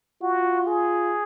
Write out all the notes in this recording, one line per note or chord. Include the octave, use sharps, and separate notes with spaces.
F4 F#4
G#4